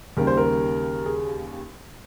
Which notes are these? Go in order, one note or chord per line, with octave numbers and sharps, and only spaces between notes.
D#2 C#3 G3 A#4
C5
A#4
G#4